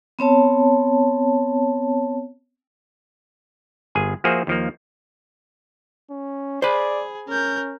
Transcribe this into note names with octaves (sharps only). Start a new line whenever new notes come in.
B3 C4 C#5 A5
G1 G#4 G#5
F3 A#3 F#4 G#4 C5 E5
D#2 F3 A#3
C#4
G#4 C5 D5 B5
C#4 A#4 G6